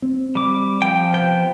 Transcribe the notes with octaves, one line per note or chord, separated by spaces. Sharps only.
C4
G3 D6
F3 G5
C3 B3 G5